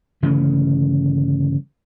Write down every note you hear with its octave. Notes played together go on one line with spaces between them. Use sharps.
G1 C#3 E3 A3